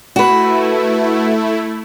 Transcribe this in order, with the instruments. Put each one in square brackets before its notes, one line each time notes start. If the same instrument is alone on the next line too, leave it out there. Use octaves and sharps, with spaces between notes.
[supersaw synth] A3 E4 [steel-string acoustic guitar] F#4 B4